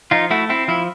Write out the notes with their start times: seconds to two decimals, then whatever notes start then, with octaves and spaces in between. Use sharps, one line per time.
0.11 F3 D#4 F4
0.31 A3 E4 F#4
0.50 C4 E4
0.68 F3 E4